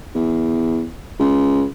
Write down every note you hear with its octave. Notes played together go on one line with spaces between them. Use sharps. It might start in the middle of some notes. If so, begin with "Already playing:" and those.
E2
C#2